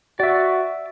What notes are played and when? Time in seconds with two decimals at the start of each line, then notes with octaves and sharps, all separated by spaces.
0.20 F#4 D5 E5